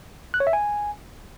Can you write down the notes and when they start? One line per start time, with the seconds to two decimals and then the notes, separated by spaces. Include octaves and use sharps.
0.34 F#6
0.40 C#5
0.47 E5
0.53 G#5